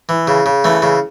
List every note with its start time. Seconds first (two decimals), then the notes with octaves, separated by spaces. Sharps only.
0.09 E3
0.28 C#3
0.46 C#3
0.64 E3 A3
0.82 C#3